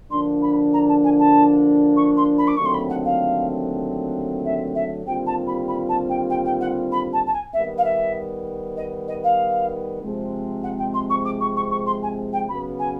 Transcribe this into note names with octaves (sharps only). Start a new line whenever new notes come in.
D3 F3 A#3 D4 C6
B5
A#5
A5
G#5
A5
C#6
C6
B5
D6
D#2 D3 F#3 A3 C4 C#6
C6
B5
F#5
F5
E5
E5
D#2 D3 G3 C4 F4 G5
A5
B5
B5
A5
G5
G5
G5
F#5
B5
A5
A5
G#5
D#3 G3 B3 E5
F5
E5
D#5
D#5
F5
C3 F3 G#3 C4
F#5
G5
C6
C#6
D6
C#6
C#6
C#6
C6
G#5
G5
C#3 F#3 B3 B5
G#5